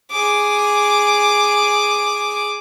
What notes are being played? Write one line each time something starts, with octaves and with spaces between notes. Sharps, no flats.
G#4 D6